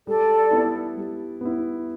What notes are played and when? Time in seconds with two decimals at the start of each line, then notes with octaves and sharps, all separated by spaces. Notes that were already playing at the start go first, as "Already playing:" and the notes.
0.07 G3 A4 D5
0.51 B3 E4
0.97 G3
1.41 B3 E4